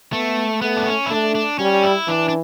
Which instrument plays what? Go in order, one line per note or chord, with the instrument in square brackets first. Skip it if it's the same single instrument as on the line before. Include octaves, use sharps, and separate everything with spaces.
[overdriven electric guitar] A3 [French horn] B3
[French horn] A3 [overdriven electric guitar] B3
[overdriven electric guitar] D4
C#4
E4
[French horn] A3 [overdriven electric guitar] D4
[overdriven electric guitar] D4
[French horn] G3 [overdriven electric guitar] C#4
[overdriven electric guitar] E4
[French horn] E3 [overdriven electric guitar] D4
[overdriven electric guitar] D4